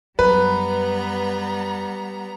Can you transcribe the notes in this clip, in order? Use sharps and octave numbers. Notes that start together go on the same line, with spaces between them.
F#2 G3 B3 B4 A#5